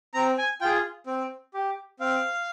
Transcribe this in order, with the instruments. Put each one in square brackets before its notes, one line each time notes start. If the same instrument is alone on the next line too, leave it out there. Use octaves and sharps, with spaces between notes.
[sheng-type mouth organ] C4 A#5
G#5
F4 G#4 G5
C4
G4
C4 F5